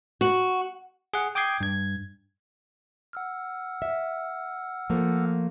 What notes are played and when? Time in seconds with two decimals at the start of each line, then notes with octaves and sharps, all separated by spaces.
0.21 F#4
1.14 G#4 F#5
1.35 G5 D6 D#6 G6 G#6 C7
1.61 G2 G#6
3.13 F#5 E6 F6
3.82 E5
4.90 F3 A3 A#3